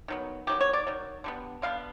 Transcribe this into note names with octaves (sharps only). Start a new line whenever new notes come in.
D#3 F#3 B3
D#3 F#3 B3 G4
C#5
D5
D#3 F#3
D3 G3 B3
D3 G3 B3 F5